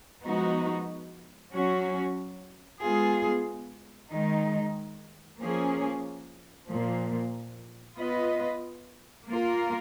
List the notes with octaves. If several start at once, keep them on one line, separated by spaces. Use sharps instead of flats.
F3 G#3 B3 D#4 F#4
F#3 C#4 F#4
G#3 B3 F4 G#4
D#3 G#3 D#4
F3 A#3 C#4 G#4
A#2 F3 A#3
B3 F4 B4 D#5
A#3 F4 A#4